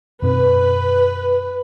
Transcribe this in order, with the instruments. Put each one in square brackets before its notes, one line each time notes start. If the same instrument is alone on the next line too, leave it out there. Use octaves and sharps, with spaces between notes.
[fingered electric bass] F#2 B2 C4 [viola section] B4